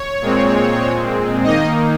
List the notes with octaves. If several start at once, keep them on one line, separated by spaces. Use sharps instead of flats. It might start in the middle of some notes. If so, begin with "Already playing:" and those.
Already playing: C#5
A#2 G#3 C4
D#3 A#3 D#4 D#5